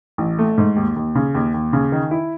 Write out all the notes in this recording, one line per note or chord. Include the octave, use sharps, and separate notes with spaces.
A1
A3
G#2
D#2
D#2
C#3
D#2
D#2
C#3
D#3
E4